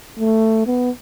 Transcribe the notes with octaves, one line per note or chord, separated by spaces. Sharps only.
A3
B3